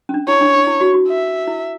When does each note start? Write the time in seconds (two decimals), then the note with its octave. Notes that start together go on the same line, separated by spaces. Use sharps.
0.09 C#4
0.14 D4
0.28 E4 C#5
0.41 D4
0.54 D4
0.67 E4
0.81 F#4
0.94 F#4
1.08 E5
1.47 E4